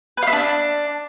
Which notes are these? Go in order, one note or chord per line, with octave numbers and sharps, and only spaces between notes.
B4
F5
E5
D4